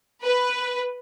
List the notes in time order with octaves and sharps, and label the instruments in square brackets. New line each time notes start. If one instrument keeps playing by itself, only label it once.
[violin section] B4